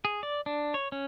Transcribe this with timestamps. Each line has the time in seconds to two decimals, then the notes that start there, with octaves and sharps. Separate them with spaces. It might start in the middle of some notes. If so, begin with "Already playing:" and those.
0.05 G#4
0.23 D5
0.46 D4
0.74 C#5
0.92 C#4